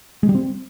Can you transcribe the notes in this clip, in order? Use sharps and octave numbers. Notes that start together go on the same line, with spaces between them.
G#3
G3
C4